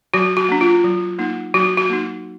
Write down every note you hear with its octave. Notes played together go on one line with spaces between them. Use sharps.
F#3 F#4
F#4
A#3 D4
F4
F#3
A#3 D#4
F#3 F#4
F#4
A#3 D#4